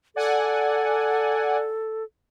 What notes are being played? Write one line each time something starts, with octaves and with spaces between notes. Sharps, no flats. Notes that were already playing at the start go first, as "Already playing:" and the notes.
A4 D5 F#5 G#5